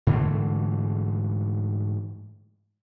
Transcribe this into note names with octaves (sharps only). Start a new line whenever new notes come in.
G#2 D3 E3 A3